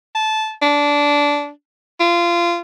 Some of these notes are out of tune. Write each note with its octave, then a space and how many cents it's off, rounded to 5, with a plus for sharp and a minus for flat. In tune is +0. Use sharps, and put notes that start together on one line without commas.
A5 -15
D4 -15
F4 -25